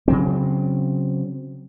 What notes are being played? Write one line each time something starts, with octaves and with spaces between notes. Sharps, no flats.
C#3 F#3 C4